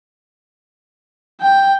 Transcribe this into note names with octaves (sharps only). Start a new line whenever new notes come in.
G5